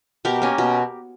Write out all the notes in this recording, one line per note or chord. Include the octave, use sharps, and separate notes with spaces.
B2 G4 A#4
A#3 C#4
B2